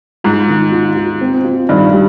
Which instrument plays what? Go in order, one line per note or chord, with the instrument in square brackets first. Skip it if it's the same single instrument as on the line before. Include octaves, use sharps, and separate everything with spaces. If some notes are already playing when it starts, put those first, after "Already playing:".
[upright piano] G#2 [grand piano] F4
[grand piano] D#3
F4
F4
C4
F4
[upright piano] G2 [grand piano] D#3
[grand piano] G3